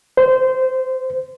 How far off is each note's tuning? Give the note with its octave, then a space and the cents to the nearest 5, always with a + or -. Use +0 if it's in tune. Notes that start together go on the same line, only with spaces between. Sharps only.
C5 -20